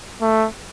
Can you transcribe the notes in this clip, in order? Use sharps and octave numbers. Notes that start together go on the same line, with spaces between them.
A3